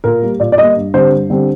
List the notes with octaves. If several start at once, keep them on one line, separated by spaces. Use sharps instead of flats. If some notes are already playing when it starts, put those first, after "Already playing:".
A#2 A#4
G3 A#3
A#2 D5
D5
G3 A#3 D#5
G2
D3 G3 C4 C5
G2
D3 G3 C4